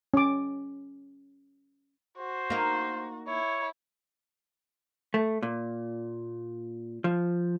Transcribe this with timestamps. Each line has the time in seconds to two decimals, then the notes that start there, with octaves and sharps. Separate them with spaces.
0.14 C#4 D6
2.18 F#4 C5
2.50 A#3 D#4
3.28 E4 C#5
5.14 A3
5.43 A#2
7.04 F3